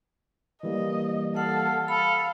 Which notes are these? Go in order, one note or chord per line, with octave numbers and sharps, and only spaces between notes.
E3 G3 A#3 D#5
A4 F5 F#5
A4 F5 B5